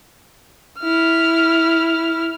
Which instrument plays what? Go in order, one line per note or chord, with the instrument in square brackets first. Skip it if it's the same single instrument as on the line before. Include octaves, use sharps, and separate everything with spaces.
[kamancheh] E4 F6